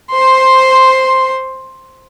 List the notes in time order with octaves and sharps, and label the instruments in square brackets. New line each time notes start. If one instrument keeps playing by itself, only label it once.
[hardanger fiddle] C5 C6